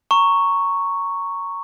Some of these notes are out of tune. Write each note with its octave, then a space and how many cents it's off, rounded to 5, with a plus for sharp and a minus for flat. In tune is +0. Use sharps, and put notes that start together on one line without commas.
A#5 -15 C#6 +0